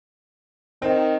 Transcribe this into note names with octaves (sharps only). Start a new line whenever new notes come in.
D#3 C4